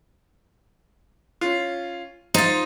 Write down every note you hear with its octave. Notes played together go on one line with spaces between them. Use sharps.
C#4 F4
D#4 F4 C5 A6